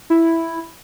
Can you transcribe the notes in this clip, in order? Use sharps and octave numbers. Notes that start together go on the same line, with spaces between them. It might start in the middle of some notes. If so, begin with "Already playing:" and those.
E4